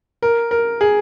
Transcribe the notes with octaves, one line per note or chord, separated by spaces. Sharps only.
A#4
A#4
G#4